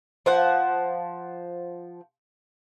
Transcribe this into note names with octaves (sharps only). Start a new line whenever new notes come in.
F3 C5 F#5